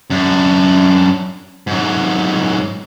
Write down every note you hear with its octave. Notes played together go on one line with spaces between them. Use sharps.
F#2 D4
G#2 F#3